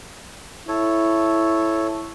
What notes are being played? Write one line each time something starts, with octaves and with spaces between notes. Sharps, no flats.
E4 A4 C#5